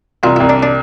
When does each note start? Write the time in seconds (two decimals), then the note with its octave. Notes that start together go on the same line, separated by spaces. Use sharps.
0.23 C2 F4
0.36 C2 E4
0.49 D4
0.63 D4